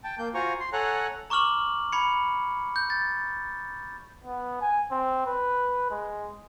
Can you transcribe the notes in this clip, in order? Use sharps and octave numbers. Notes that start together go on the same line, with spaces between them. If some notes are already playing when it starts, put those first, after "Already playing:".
G5 A5
A#3 G6
F4 F#4 C5 G#5 A#5 C#6
C6
A4 C#5 F#5 G#5 A#5 F#6
A#5 C#6 D6 F6 F#7
B5 G#6 C#7
G6
A6
B3
G#5
C4
B4
G#3